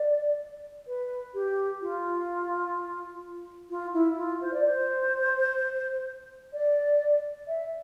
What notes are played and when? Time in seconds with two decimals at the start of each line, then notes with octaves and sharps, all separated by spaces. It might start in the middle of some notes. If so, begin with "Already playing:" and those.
Already playing: D5
0.87 B4
1.34 G4
1.81 F4
3.70 F4
3.93 E4
4.17 F4
4.41 C5
4.53 D5
4.64 C5
6.53 D5
7.47 E5